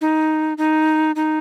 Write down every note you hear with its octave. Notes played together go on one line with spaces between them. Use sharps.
D#4
D#4
D#4